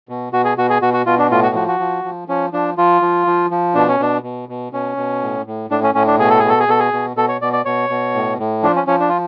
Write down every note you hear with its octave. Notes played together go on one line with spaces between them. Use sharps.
B2
B2 F#4
G#4
B2 F#4
G#4
B2 F#4
F#4
B2 F4
D4
A2 F4
F#4
F3 F#4
F#4
F3
F3
F3 C#4
F3 D4
F3 F4
F3
F3
F3
B2 D4
C#4
B2 D4
B2
B2
B2 C#4
B2
A2
A2
A2 D4
C#4
A2 C#4
D4
B2 G#4
A4
B2 G#4
A4
G#4
B2 A4
G#4
B2
B2 A4
C#5
B2 D5
D5
B2 C#5
B2
A2
A2
F3 D4
C#4
F3 C#4
D4
F4